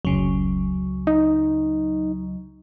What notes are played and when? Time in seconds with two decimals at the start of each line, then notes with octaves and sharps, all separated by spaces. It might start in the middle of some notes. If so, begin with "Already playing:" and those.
0.05 F1 C#2 C#3 F#3
1.07 D#4